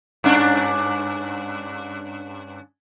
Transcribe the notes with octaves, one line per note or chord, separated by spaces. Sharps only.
G2 C#4 D4